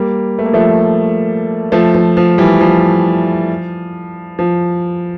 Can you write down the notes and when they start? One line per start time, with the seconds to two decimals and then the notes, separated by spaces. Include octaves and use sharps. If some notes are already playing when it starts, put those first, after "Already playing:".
Already playing: G3 A#3
0.39 A3
0.46 A#3
0.53 F3 A3
1.72 F3 A3
1.95 F3
2.17 F3
2.38 E3 G3
2.61 F3
4.39 F3